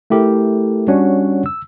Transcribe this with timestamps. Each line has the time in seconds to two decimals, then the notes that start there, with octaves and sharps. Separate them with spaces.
0.10 A3 E4 G4 A4 A#4
0.88 G3 C#4 D4 F#4 C#5 F#5
1.46 E6